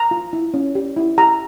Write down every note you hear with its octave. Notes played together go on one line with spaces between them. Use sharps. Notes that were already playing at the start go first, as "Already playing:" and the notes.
Already playing: A#5
F4
E4
C#4
G4
E4
G4 A#5